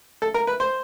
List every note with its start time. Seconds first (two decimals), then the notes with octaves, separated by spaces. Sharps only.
0.22 A4
0.34 A#4
0.47 B4
0.60 C5